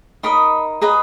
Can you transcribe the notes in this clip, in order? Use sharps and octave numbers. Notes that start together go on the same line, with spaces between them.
D#4 A#4 D#5 B5
G#4 B4 D#5 A#5